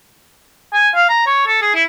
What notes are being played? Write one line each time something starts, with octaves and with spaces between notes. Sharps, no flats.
G#5
F5
A#5
C#5
A4
G#4
E4